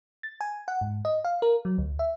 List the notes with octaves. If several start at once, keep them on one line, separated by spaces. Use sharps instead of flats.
A6
G#5
F#5
G#2
D#5
F5
A#4
F#3
D2
E5